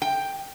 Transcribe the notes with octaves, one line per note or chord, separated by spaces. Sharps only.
G5